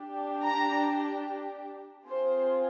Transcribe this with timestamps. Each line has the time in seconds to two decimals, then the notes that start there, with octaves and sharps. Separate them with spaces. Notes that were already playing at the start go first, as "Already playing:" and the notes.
Already playing: D4 G4
0.43 A#5
2.07 C4 F4 G#4 C5